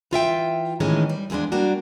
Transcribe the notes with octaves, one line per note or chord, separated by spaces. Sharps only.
E3 F4 E5 G5
A2 D#3 E3 G#3 A3 C#4
G3
E2 F3 G#3 B3 D4
G3 A#3 D4 F#4